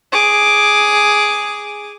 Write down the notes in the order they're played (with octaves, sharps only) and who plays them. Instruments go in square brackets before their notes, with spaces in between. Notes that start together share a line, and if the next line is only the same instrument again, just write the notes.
[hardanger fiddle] G#4 D6